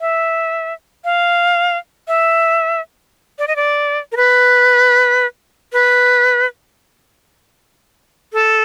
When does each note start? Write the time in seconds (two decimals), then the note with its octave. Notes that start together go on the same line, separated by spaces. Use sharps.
0.01 E5
1.05 F5
2.08 E5
3.39 D5
3.48 D#5
3.56 D5
4.12 A#4
4.17 B4
5.73 B4
8.33 A4